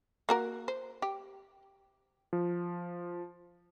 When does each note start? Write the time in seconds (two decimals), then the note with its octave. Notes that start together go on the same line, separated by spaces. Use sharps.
0.29 A#3 F#4 A#4
0.68 C5
1.02 G4
2.33 F3